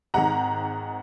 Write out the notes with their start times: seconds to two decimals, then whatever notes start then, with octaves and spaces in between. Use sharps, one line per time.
0.14 G#1 G#2 D#3 F#5 A#5